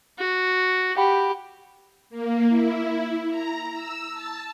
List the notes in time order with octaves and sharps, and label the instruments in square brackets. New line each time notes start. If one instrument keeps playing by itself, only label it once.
[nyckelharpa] F#4
[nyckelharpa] G4 [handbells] F#5 G5 B5
[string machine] A#3
E4
A#5
E6
A5